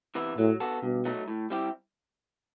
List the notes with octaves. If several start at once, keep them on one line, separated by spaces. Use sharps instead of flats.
C3 E3 B3 E4
A2 F#3
B3 F#4 A4
G2 B2
F#3 A3 D#4
A2
G3 C4 E4 G4